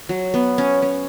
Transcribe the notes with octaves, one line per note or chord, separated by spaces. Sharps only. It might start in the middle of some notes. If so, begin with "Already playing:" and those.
F#3
B3
C#4
C#4